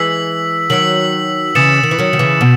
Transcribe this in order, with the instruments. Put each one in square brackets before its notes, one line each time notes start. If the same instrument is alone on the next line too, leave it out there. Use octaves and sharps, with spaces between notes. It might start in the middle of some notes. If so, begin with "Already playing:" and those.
Already playing: [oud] E3 G#3 [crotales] E6 B6 F#7
[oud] D#3 F#3 [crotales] E6 B6 F#7
[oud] C#3 E3 [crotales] D#6 A6 C#7 E7
[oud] D#3
E3
D#3 F#3
D#3
C#3 E3
B2